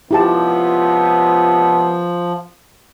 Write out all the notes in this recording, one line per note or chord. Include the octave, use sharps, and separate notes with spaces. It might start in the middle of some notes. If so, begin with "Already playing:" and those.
C#2 C3 F3 B3 E4 G4 A5